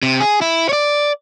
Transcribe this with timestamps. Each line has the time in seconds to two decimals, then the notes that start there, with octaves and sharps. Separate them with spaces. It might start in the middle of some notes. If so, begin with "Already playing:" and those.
0.03 C3
0.20 G#4
0.41 E4
0.69 C#5 D5